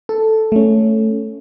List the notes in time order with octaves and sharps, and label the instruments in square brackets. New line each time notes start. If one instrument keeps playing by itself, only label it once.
[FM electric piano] A4
A3 C#4